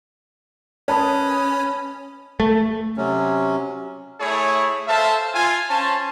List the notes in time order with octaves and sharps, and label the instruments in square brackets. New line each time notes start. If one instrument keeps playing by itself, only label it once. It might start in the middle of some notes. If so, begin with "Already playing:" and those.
[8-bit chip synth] C#4 [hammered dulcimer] B4 D#5 [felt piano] C#5 A5
[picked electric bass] A3
[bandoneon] C3 F#3 C#4
[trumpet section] A3 E4 G#4 C#5
A4 C5 E5 F5 A5
F4 G#5
C#4 C5 A5